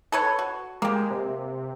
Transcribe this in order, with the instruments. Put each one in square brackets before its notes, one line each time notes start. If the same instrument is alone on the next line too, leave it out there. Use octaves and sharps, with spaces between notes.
[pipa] A4 B4 C#5
F#4
[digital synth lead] G#3 [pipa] A#3 G4
[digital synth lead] C3